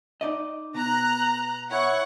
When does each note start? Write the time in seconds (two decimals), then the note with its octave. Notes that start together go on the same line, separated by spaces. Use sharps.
0.21 D#4 D5 D#5
0.74 B2 A#5 F#6
1.71 E4 C#5 F#5 C#6